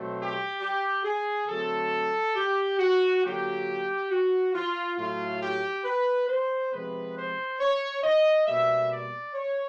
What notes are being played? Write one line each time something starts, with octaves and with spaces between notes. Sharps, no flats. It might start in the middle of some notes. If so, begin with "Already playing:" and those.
Already playing: B2 F#3 A3 C4
G4
G4
G#4
D3 F#3 A3 C4 A4
G4
F#4
D3 F#3 A#3 G4
F#4
F4
A2 F#3 A3 F4
G4
B4
C5
C3 F3 G#3 B3 B4
C5
C#5
D#5
B2 G3 A#3 E5
D5
C#5